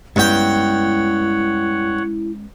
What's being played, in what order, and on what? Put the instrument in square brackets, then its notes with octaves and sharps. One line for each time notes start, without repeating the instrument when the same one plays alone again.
[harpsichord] G2 G5 [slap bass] G#3 B3 C#4 [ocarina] E4 [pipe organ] C#5 F#5